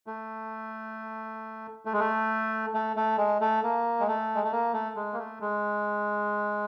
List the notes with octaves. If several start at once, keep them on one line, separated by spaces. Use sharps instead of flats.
A3
A3
G#3
A3
A3
A3
G#3
A3
A#3
G#3
A3
G#3
A3
A#3
A3
G#3
A#3
A3
G#3